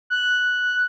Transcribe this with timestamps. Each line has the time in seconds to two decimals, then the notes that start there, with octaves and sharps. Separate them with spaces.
0.10 F#6